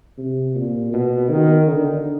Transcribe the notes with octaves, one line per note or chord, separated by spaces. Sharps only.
C3
A#2
B2
D#3
D3